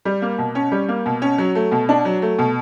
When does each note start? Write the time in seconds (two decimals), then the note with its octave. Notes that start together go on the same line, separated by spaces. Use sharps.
0.05 G3
0.22 A#3
0.38 B2
0.55 C#4
0.72 G3
0.89 A#3
1.06 B2
1.22 C#4
1.38 F#3
1.55 A3
1.72 B2
1.89 D4
2.05 F#3
2.22 A3
2.39 B2